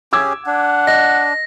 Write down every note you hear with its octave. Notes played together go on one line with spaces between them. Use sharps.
C#4 G4 G#4 D6 E6 G#6
D4 F#5
D#5 A#6